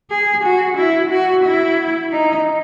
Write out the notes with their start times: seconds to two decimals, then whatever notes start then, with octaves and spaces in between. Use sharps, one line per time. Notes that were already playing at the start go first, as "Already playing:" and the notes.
0.11 G#4
0.44 F#4
0.78 E4
1.11 F#4
1.44 E4
2.12 D#4